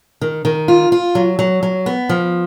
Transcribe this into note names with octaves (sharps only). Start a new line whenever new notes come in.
D#3
D#3
F4
F4
F#3
F#3
F#3
B3
F3